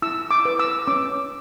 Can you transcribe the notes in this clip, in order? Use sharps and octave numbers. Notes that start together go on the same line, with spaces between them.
E4 E6
D6
B4
E6
C#4 D6